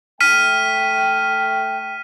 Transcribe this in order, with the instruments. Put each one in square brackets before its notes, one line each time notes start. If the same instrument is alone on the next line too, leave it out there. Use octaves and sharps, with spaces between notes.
[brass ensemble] A3 G5 [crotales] F6 B6 D#7